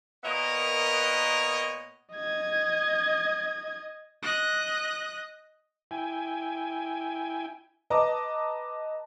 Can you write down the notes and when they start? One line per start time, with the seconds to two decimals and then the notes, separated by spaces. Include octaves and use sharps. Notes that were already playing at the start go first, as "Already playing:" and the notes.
0.24 A#2 B3 A#4 C#5 D#5
2.14 D#5 G#6
4.22 D#5 F#6
5.91 E4 G5 G#5
7.90 B4 D#5 A5 A#5 D6